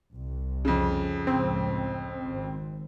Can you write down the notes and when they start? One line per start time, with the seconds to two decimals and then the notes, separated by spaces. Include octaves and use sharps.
0.14 C2
0.65 F2 C#3
1.27 C#2 A2 F3 C4
2.22 G#1